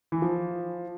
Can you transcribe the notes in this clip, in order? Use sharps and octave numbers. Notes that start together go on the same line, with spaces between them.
E3
F3